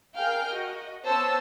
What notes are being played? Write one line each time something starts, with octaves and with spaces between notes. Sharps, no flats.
G#4 A#4 F5 G5 F6 G6
F#4 D#5
B3 C5 C#5 A5 E6